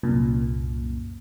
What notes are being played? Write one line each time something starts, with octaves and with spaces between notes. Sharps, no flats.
C2 F#2 A#2